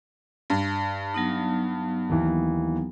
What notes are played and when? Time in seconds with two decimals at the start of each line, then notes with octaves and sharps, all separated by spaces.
0.50 G2
1.14 F#3 B3 D#4
2.09 D#2 E3